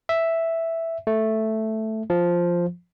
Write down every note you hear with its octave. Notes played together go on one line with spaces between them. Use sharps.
E5
A3
F3